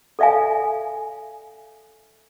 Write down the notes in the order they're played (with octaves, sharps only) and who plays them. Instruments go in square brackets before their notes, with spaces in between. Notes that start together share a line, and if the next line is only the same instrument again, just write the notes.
[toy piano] A4 D5 E5 F5 G#5